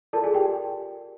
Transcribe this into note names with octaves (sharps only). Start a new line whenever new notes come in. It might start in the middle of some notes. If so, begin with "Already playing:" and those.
F4 A4 A#4 D5 A5
G#4 G#5
G4 G5